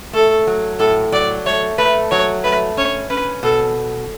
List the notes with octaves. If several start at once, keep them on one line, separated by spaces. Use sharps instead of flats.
A3 A4
F#3
A2 A4
F#3 D5
A3 C#5
A3 B4
F#3 C#5
A3 B4
C#4 C#5
C#4 B4
B2 A4